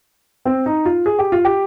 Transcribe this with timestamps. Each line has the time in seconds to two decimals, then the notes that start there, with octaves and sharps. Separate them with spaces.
0.45 C4
0.66 D#4
0.86 F4
1.06 G#4
1.19 G4
1.32 F4
1.45 G4